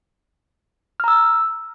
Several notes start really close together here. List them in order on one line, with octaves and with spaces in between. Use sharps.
F6 A#5 E6